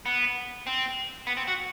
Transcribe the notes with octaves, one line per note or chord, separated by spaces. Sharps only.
B3
C4
B3
C4
F#4